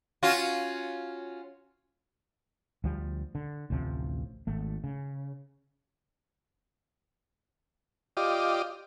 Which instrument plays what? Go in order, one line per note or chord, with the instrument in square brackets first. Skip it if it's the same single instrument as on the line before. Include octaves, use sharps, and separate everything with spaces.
[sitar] C#4 F4 F#4
[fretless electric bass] D2 F3 G3
D3
A1 D2 C3 F3
G#1 A3
C#3
[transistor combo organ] F4 G4 D5 D#5